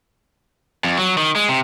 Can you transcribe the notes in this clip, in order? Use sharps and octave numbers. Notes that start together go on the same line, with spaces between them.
F2
F#3
D#3
G#3
C3